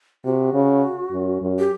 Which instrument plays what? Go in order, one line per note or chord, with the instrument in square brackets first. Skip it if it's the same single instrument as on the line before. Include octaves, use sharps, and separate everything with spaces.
[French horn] C3 [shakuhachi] F#4
[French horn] C#3
F#2
F#2
[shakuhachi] G4